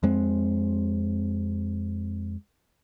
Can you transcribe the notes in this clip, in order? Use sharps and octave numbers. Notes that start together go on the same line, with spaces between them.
F2 G#3 C4